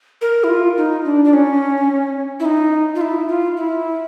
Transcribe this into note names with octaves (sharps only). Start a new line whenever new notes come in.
A#4
E4
F4
D#4
D4
D4
C#4
E4
D#4
F4
E4
F4
E4